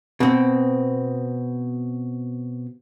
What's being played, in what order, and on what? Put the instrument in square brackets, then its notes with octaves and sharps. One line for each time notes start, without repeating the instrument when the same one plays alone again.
[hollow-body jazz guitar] B2 C4